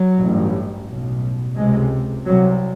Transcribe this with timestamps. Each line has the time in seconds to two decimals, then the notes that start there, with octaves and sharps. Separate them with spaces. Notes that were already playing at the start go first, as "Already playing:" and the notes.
Already playing: F#3
0.19 A1 G2
0.87 B1
0.92 B2
1.56 C#2 C3 G#3
2.25 C2 C3 F#3